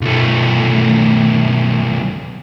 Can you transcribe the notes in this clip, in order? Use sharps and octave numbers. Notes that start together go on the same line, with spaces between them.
B1 A3